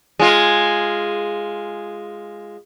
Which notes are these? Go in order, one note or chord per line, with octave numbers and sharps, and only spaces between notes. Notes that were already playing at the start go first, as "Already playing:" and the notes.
G#3 F4